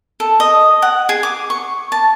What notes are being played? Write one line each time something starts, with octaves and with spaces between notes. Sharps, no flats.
A4
D#5
F#5
G#4
D6
C#6
A5